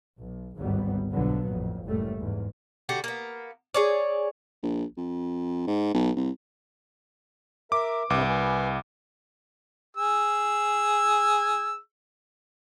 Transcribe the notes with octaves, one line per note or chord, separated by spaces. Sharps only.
B1
G#1 D2 G2 F#3 G3 B3
B1 B2 D3 F3 F#3 B3
A1 F2 A#2
F#1 C#2 F#2 A2 G3 A3
E2 G#2
D3 F#4 G4
A#3 B3
G#4 C#5 D5
A#1
F2
G#2
B1
C2
A#4 E5 D6
C2 G2 C3 B4 D6
B4 G#5
G#4 E6